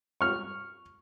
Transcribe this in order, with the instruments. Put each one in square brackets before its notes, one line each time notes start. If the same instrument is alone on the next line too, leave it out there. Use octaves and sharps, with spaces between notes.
[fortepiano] C#6 F6